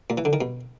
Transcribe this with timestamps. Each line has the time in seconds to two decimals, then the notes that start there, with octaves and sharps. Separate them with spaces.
0.10 A#2
0.18 E3
0.25 D3
0.33 D#3
0.41 B2